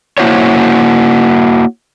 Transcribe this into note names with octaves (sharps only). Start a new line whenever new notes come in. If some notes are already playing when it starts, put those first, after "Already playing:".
A#3 C4 E4 F#4 C5 C#5